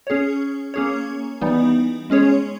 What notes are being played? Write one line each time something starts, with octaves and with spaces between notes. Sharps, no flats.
C#4 G#4 C#5
A#3 C#4 G#4 C#5
E3 G3 B3 D#4
G#3 C#4 G#4 C#5